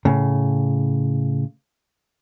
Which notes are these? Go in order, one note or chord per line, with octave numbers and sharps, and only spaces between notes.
A2 C#3